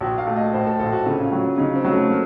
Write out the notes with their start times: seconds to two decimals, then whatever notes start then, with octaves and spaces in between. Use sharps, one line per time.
0.01 A#1 F#4
0.18 F5
0.27 A3
0.36 D#5
0.53 A2 C5
0.67 A4
0.79 A#1 A4
0.92 F#4
1.06 C#3 F4
1.32 F#3
1.58 C#3 D#4
1.76 C4
1.84 F#3
1.93 A3
2.11 A#3